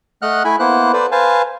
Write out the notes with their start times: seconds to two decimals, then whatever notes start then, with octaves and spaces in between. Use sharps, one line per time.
0.22 A3 D#5 F#5 F6 F#6
0.45 A3 E4 E5 G#5 B5
0.59 A#3 B3 E4 C5 F#6
0.93 A4 B4 C5 D5
1.12 B4 C5 F5 G#5 A5